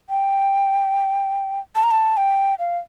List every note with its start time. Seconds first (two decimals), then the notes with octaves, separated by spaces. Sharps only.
0.10 G5
1.76 A5
1.83 A#5
1.91 A5
2.17 G5
2.59 F5